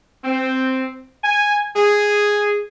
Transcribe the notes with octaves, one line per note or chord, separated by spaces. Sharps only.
C4
G#5
G#4